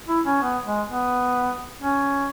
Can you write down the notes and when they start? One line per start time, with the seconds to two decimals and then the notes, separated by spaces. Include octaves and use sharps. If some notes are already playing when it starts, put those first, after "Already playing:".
0.08 E4
0.26 C#4
0.42 B3
0.66 G#3
0.89 B3
1.80 C#4